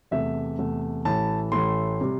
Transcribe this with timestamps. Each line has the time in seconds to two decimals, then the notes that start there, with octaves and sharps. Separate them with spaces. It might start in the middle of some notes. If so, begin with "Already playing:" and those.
0.11 E2 C3 A3 E5
0.59 E2 C3 A3
1.05 A1 A2 E3 A3 E4 A5
1.52 A1 A2 E3 A3 E4 C6
2.01 C3 G3